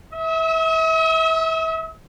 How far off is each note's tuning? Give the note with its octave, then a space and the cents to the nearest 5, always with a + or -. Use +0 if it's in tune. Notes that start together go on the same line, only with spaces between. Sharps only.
E5 -30 D#6 +45